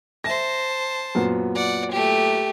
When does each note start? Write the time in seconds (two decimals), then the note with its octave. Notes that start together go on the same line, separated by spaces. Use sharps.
0.24 C5 E5 A5 A#6
1.15 F#2 A#2 B3
1.55 D5 F#5
1.91 A3 G4